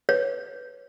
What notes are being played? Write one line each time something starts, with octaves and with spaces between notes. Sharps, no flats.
B4 C#5